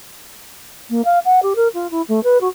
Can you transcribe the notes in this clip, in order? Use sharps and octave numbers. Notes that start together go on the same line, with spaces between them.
A#3
F5
F#5
G4
A#4
F4
E4
A3
B4
F#4